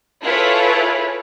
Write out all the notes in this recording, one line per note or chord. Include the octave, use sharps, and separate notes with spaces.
E4 F4 G#4 A4 B4 C#5